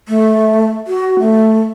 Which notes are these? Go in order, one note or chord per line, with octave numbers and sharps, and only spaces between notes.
A3
F#4
A3